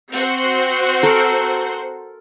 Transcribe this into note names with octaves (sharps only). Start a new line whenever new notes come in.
C4 F#4 C5
A4 A#4